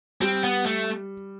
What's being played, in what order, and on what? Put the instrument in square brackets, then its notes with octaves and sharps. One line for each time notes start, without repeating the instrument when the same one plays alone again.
[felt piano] G3 [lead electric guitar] C4
[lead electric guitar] B3
A3